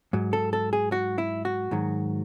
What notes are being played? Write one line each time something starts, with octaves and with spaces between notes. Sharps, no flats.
G#2 F#3
A4
A4
G#4
F#4
E4
F#4
G#2 D#3 F#3